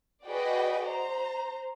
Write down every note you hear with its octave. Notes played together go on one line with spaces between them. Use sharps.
F#4 G#4 B4 D5 D#5 G5
C5 A#5